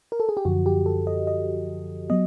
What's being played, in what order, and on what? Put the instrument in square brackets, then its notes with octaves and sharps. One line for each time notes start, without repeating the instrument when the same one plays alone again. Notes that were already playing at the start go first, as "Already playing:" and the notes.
[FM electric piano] A#4
A4
G#4
G4
F#2 D3 F3 F#4
G4
A4
D#5
D#5
F#3 B3 D#5